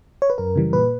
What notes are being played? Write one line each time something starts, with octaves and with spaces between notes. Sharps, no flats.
C#5
B4
F#2 A#4
C#3 E3 G3
A#2 B4